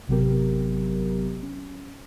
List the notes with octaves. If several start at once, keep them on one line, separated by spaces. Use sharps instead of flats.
G#1 C3 F#3 B3 G4 A#4
C#4